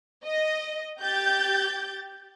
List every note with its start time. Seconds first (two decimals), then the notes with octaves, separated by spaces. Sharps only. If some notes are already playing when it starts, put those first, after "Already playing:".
0.25 D#5
1.01 G4 G6 A6